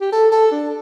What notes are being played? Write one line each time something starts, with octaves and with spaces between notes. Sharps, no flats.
G4
A4
A4
D4